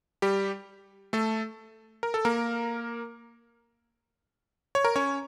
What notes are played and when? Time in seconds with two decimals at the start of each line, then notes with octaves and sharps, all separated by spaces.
0.22 G3 G4
1.13 A3 A4
2.03 A#4
2.14 A4
2.25 A#3 A#4
4.75 C#5
4.85 A#4
4.96 C#4 C#5